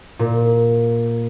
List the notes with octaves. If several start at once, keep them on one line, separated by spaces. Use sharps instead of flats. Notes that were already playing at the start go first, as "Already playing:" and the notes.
A#2